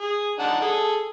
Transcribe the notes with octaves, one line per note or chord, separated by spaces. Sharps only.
G#4
D4 D#4 F#5
G#4 A4